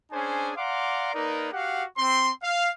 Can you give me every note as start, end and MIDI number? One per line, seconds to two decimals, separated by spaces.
0.12 0.51 61
0.12 0.51 62
0.12 0.51 68
0.12 0.51 72
0.12 0.51 80
0.56 1.11 74
0.56 1.11 77
0.56 1.11 78
0.56 1.11 82
0.56 1.11 84
0.56 1.11 86
1.14 1.48 58
1.14 1.48 63
1.14 1.48 70
1.14 1.48 71
1.14 1.48 74
1.53 1.84 66
1.53 1.84 67
1.53 1.84 77
1.53 1.84 78
1.97 2.31 60
1.97 2.31 84
2.43 2.71 77